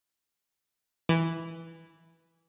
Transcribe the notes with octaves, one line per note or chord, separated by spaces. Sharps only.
E3